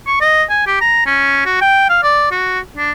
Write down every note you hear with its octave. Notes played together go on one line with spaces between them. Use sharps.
C#6
D#5
G#5
G4
A#5
C#4
F#4
G5
F5
D5
F#4
D4